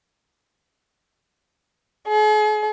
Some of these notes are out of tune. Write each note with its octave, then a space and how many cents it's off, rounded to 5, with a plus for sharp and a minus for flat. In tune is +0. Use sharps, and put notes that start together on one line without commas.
G#4 +45